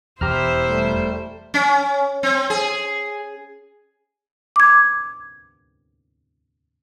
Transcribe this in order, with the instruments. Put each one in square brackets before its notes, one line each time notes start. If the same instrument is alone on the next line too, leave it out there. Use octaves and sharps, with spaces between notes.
[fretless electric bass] E1 E2 [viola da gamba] E4 C5 [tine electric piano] G4 A#5 F6
[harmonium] G3 A3
[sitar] C#4
C4
G#4
[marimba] D6 G#6